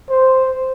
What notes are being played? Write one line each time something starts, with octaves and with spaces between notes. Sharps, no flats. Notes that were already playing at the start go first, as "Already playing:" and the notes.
C5